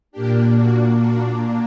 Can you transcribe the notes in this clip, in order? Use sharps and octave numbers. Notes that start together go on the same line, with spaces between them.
A#2 A#3 D4 G4
F#4
F#4